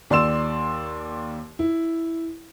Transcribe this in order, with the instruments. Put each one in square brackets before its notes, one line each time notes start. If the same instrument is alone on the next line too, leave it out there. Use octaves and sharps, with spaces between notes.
[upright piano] D#2 D5 C6 E6 E7
E4